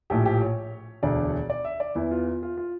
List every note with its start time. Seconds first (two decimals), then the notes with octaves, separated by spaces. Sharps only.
0.10 A#1 A2 F3 G4
0.26 G4
0.41 C#5
1.03 E1 D2 D3 D5
1.50 D5
1.65 E5
1.80 D5
1.95 E2 E3 E4
2.11 F4
2.26 F4
2.43 F4
2.57 F4